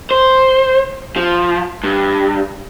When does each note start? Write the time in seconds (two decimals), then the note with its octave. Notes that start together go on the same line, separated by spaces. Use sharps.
0.11 C5
1.16 F3
1.84 G2